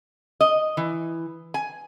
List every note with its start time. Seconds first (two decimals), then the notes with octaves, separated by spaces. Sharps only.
0.41 D#5
0.77 E3
1.54 G#5